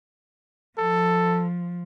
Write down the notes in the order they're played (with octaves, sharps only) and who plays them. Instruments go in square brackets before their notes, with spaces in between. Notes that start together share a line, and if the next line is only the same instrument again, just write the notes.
[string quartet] F3 [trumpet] A4